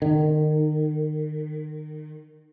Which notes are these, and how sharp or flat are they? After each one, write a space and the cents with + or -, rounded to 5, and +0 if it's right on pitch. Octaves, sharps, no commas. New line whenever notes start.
D#3 -25